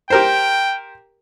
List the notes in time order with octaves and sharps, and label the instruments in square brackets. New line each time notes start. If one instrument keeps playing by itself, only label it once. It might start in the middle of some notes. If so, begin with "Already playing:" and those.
[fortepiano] G4 A#4 C5 [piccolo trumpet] G5